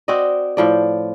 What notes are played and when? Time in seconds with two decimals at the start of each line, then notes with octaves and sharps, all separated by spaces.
0.08 C4 F#4 D5 D#5
0.57 A2 F3 D5